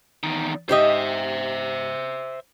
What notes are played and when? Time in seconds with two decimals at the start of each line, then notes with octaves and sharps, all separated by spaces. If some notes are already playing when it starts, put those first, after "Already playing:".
0.23 E2 D#3
0.69 G#2 G4 C5 D#5 E5